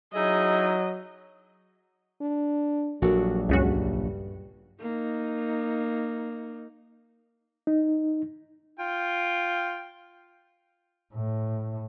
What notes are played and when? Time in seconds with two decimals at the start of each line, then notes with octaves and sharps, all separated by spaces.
0.15 F#3 D#4 E4 G#4 D#5
2.21 D4
3.02 A#1 F#3 G3 F#4 A4 A#4
3.49 C#2 G2 C#3 F#4 E5
4.81 A#3 D#4
7.67 D#4
8.80 F4 G5
11.13 A2